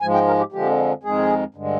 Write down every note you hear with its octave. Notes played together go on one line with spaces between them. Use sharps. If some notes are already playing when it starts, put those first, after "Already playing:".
G#2 F3 G#3 G#5
G5
A#4
G4
F2 D3 F3 G#3 G4
F2 D#3 G#3 G#4
G2 D3 G#3